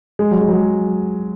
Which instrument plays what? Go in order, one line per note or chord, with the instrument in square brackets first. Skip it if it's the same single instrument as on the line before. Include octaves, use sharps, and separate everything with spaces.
[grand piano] G#3
F#3
G#3
F#3
G#3